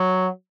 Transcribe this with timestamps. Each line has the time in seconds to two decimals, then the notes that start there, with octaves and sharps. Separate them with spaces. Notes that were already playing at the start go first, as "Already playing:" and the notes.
Already playing: F#3